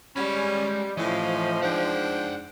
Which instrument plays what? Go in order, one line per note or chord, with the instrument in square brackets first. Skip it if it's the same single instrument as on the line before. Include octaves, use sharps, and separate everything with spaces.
[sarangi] G3 [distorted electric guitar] G#3 B5 [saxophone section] C#4
[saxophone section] A2 C#4 D#5 [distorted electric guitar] E3 [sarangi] F3
[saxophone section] G#2 D4 C5 [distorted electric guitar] F#5 G5